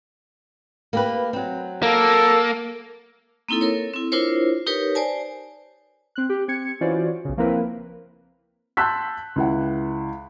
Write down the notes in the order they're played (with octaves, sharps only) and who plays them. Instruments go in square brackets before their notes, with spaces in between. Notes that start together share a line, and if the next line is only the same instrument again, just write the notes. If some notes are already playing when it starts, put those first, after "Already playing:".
[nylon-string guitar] A#3 G4 B4
F#3 C4
[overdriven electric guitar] A#3 [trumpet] A4
[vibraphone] A#3 C4 D#4 E4 A4
A4 A#4 C#5
C4 E4
D4 E4 F4 A#4 C5 C#5
D#4 G4 A#4 B4 C#5
C5 D5 G#5 A5
[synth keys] C4 F#6
G4
C4 G#6 C#7
E3 C#4 F4 F#4 C5 D5
B1 C#3
F3 A#3 C4 E4 A#4 B4
[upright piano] A5 C6 E6 F#6 G6 B6
C#2 E4 F#5